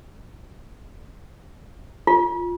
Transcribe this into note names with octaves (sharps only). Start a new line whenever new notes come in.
F4